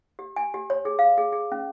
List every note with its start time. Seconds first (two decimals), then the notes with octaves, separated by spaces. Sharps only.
0.19 G4
0.36 G#5
0.54 G4
0.70 C#5
0.85 G#4
0.99 F5
1.18 G#4
1.32 G#4
1.52 C#4